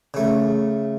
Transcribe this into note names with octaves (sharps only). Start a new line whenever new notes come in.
C#3 A3